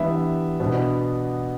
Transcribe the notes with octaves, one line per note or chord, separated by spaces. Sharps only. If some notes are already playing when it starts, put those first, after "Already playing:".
Already playing: E3 G3 B3 D4 E5
B2 B3 D4